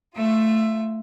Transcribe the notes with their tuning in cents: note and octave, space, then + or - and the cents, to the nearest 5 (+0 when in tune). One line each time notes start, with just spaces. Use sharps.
A3 +5 F4 +0 E5 +15